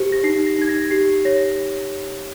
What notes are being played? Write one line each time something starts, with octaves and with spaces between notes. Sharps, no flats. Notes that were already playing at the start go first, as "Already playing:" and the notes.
Already playing: G4 C5 C#7
A#6
D#4 C7
A#6
D#4 G#6
A#6
G4 C7
C#5 A#6